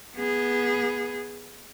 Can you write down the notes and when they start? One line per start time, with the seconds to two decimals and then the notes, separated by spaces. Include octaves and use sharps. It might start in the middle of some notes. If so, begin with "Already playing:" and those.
0.15 B3 G#4